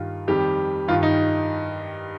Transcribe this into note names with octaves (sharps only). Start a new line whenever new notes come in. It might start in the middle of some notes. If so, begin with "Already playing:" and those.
Already playing: G2 D#3 F4
F2 D#3 G3 G4
G2 D#3 F4
D#4